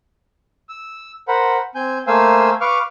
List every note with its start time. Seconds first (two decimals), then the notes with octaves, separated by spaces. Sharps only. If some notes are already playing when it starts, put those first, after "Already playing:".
0.69 E6
1.28 A#4 C5 F#5 B5
1.75 C4 G#5 G6
2.07 A3 A#3 C5 F5 G#5 E6
2.61 B4 F5 C#6 D6 F6